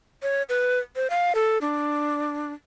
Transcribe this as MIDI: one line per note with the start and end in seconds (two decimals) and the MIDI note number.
0.22 0.43 73
0.49 0.79 71
0.96 1.10 72
1.10 1.33 77
1.35 1.58 69
1.61 2.53 62